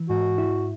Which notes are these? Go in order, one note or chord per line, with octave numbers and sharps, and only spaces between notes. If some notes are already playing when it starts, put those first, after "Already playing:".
Already playing: E3
G#2 F#4
E4